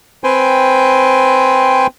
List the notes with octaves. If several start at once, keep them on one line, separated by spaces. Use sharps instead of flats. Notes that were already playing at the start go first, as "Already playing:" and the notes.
C4 B4 C5 G5 G#5